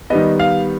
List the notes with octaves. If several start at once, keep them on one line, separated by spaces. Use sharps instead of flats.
D#3 G3 B3 D#5
F5